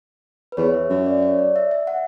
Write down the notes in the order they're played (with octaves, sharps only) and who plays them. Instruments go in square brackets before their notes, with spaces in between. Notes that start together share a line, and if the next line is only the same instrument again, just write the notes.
[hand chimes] B4
[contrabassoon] E2 [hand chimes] C#5
[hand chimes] E5
[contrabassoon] F#2 [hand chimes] E5
[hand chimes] D5
C#5
D5
E5
E5
F#5